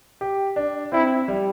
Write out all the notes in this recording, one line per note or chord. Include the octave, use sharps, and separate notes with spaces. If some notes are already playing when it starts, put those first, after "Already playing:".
G4
D4
C4 E4
G3